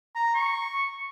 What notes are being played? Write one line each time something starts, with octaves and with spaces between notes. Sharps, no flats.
A#5
C#6